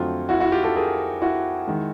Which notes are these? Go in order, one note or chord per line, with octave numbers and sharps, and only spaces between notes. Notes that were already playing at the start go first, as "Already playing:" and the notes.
Already playing: F2 D3 F#3 A3 F4
E4 F#4
E4 F#4
F4 G4
G4 A4
G#4 A#4
E4 F#4
D#3 G#3